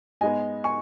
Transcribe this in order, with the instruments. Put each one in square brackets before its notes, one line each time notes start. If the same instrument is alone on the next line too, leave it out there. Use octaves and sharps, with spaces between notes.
[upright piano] G#2 G#3 B3 D#5 G#5
G#5 C#6